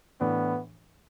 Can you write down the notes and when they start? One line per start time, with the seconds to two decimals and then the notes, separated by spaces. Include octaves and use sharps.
0.21 A2 E3 B3 D4